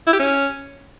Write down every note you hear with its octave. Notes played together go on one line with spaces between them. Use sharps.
E4
G4
C#4